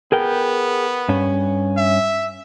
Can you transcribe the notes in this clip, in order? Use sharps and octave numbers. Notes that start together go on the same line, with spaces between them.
B3 G#4 A#4 G5
G2 C#4
E5